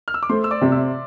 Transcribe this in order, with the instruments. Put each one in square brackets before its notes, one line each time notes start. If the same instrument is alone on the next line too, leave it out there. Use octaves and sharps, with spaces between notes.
[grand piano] F6
E6
D6
[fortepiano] A3 [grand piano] C5 C6
[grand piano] E6
D5 D6
[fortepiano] C3
[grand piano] E5 E6